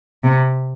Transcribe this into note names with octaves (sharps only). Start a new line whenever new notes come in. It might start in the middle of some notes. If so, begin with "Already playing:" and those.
C3